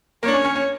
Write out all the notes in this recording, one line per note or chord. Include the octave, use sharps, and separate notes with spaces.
A#3 C#5
D4
C#4
C#4
C#4